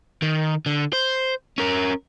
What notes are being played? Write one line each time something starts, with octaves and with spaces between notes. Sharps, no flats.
D#3
D3
C5
C#4 A#4